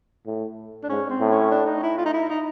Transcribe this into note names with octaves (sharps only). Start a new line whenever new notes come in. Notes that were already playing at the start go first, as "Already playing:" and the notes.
A2
D4
G#2 C#4
C4
A2
C#4
D4
D#4
E4
F4
D#4
E4
D#4